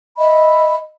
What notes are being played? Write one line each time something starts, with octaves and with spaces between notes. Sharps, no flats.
D#5 E5 B5